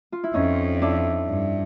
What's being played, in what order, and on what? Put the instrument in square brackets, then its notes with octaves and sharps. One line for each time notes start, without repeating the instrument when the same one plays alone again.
[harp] F4
E4
[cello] F2 [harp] C#4 D#4
[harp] D4 E4
[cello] G2